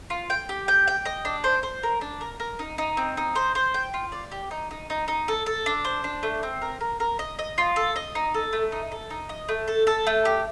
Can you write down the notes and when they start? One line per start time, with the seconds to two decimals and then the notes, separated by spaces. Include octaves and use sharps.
0.10 F4
0.30 G5
0.49 G4
0.68 G5
0.87 G5
1.05 D#5
1.25 D4
1.44 C5
1.63 C5
1.83 A#4
2.01 D4
2.21 A#4
2.40 A#4
2.59 D#4
2.78 D#4
2.97 C4
3.17 D#4
3.35 C5
3.55 C5
3.74 G5
3.94 F4
4.12 D5
4.31 G4
4.51 D#4
4.71 D#4
4.90 D#4
5.08 D#4
5.28 A4
5.46 A4
5.66 D4
5.85 C5
6.04 D4
6.23 A3
6.43 C4
6.62 A#4
6.80 A#4
7.00 A#4
7.19 D#5
7.39 D#5
7.58 F4
7.76 A4
7.96 D#5
8.15 D#4
8.34 A4
8.53 A3
8.72 D#4
8.92 A4
9.10 D#4
9.29 D#5
9.49 A3
9.68 A4
9.87 A4
10.07 A3
10.25 G4